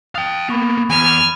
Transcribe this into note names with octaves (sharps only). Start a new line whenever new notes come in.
F5 G5 D#6 F#6 A6
A#3 B3 B5 C#6 F7
E2 G#5 A#5 B5 F6